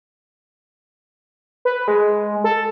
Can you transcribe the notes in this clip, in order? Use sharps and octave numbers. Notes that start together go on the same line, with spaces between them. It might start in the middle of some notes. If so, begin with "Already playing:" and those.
B4
G#3
A4